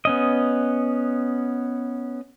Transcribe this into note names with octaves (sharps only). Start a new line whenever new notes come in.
B3 C#4 D#5